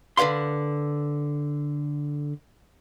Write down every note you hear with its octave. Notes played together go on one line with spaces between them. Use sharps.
D3 B4 C#5 F5 C6